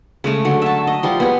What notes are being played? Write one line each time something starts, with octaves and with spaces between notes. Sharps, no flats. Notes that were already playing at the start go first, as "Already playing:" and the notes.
C#3 G#3 A3
D3 F#3
E5 A5
D#5
F3 G3 C6
B3 G#4